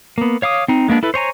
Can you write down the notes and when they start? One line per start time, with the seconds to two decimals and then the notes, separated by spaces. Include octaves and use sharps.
0.18 A#3 B3
0.42 C#5 F5 D6 D#6
0.68 C4 D#4
0.88 G#3 A#3 B3 D4
1.03 E4 A4 B4
1.14 C5 C#5 G#5 A#5